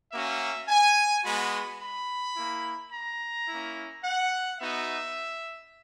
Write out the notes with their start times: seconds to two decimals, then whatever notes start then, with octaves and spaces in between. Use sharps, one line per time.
0.12 A#3 C#4 F#4 E5
0.68 G#5
1.24 G#3 B3 F#4 B5
1.80 B5
2.36 A#3 E4
2.92 A#5
3.48 A#3 C#4 E4
4.04 F#5
4.60 B3 D#4 F#4 E5